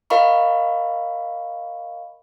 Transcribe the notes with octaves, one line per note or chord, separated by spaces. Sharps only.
A#4 D#5 F5 B5 C#6